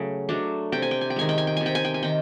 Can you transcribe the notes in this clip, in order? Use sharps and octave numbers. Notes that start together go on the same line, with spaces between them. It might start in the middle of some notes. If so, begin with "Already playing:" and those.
Already playing: C#3 F#3 A3
F#3 A3 D4
C3 G5
G#5
G5
G#5
G5
D#3 G#3 G#5
G5
G#5
G5
C3 G#5
G5
G#5
G5
G#5
D#3 G5